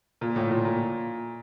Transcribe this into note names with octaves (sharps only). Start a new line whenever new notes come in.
A#2
A2
A#2
A#2